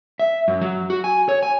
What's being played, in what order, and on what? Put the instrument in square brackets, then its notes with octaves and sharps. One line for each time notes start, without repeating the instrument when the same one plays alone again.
[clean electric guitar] E5
F#2
F#3
F#4
G#5
C#5
G#5